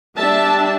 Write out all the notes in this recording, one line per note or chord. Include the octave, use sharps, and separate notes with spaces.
G3 D4 E5 A5